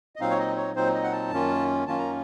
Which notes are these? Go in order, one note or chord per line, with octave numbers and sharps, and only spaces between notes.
D#5
A#2 F#3 C4 D#4 F5
C#5
D#5
C#5
A#2 F#3 C4 D#4 C5
D#5
F#5
A5
F#2 D#3 A#3 C#4 F4
F#2 D#3 A#3 C#4 F4 A5
A#5